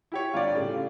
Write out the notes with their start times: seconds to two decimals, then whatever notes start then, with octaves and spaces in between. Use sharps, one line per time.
0.12 E4 G4 C#5
0.34 G1 F4 D5
0.55 A2 C#3 G3